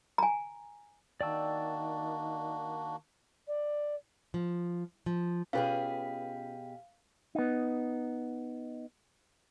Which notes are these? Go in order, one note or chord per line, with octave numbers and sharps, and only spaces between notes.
G#5 A#5
D#3 A#3 D4 F#4 D5 G5 E6
D5
F3
F3
B2 C#4 F4 G4 G#4 B4 F5
B3 D#4